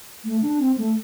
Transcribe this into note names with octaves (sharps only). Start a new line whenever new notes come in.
A3
D4
C4
A3